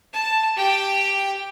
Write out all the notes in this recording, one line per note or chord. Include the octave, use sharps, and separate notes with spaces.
A5
G4 G5